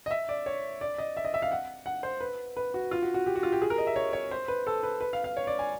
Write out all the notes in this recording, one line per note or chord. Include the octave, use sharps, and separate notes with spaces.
D#5
E5
D5
C#5
D5
D#5
E5
D#5
E5
F5
F#5
F#5
C5
B4
B4
F#4
F4
F#4
F#4
G4
F#4
F4
G4
G#4
A#4
D#5
E5
C#5
C#5
C5
B4
A4
B4
B4
F5
F5
C#5
D5
G#5